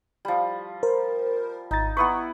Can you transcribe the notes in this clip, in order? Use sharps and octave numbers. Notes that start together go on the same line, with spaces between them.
F3 G3
A#4 C5
G#1 D#4 A6
B3 E4 B4 C#6 D#6